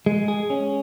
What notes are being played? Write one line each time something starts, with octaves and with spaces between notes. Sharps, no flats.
G#3
G#4
C#4